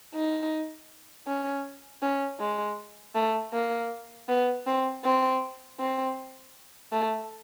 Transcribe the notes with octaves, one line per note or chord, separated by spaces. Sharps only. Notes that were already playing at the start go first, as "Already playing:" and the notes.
D#4
C#4
C#4
G#3
A3
A#3
B3
C4
C4
C4
A3